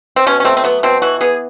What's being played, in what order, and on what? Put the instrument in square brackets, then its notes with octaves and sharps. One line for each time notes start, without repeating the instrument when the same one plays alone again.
[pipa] C4
B2 C#4
C#4
A3 C4
C4
F#3 B3
B2 C4
E3 F#4
B3 G#4